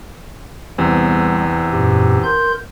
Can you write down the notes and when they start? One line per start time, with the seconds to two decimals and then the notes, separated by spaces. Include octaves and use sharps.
0.78 E2 C3 G3 B3
1.70 F#2 A#2 G4
2.23 A#4 C6 G6